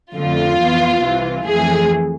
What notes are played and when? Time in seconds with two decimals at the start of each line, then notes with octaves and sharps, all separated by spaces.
0.14 F2 D3 A3 F4
0.59 F2 E3 B3
1.02 C2 C3 E3
1.46 F2 E3 A3 G#4